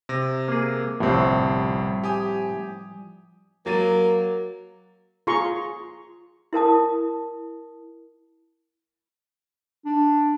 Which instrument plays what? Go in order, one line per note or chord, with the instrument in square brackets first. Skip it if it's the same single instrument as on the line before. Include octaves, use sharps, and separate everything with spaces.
[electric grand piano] C3 A#6
[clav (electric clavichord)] A#3 G#4
[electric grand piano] G1 C2 [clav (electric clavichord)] A2 C4 [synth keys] F3 G3
[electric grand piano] G4 G#5 D#6
[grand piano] F#3 A6 D#7 [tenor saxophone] A#3
[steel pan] F4 G#4 A#5 C6 C#6
[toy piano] E4 A#4 A5 D#6
[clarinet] D4